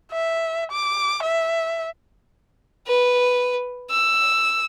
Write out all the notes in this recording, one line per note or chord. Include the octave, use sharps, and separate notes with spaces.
E5
D6
E5
B4
E6